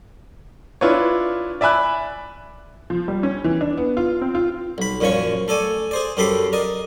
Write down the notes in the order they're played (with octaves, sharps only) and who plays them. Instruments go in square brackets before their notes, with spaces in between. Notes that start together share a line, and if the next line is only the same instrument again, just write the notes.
[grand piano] D4 E4 F4 B4 C#5
D5 E5 G#5 B5 F#6
[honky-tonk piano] F3
G3
C#4
E3
D4
B3
F4
C4
F4
[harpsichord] B1 B5
F#2 A#2 F3 C#4 C#5 C#6
A3 A4 D5 G#5
G#4 C5 D5
F#2 G4 A4 B5 C6 D6
A#4 D5 D#5